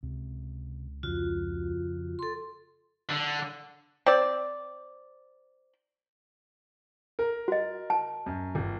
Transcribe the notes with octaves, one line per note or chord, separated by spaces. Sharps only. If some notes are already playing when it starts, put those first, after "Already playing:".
C#2 C3
F2 C#3 F4 F#4
A4 C6
D3
C4 D5
A#4
F#4 D#5
A5
F#2
G1